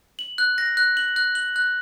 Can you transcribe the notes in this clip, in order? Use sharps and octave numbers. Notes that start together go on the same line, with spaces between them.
F#7
F#6
A#6
F#6
F#7
F#6
F#7
F#6